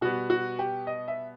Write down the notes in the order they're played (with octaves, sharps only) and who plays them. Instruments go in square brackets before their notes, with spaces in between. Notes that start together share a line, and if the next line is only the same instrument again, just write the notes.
[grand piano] B2 G3 B3 F#4
F#4
G4
D#5
E5